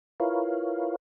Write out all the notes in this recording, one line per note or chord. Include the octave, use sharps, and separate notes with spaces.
E4 F4 A#4 B4 C#5 F5